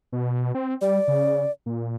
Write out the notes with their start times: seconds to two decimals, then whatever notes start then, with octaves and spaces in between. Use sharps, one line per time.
0.12 B2
0.55 C4
0.81 G3 D5
1.08 C#3
1.66 A#2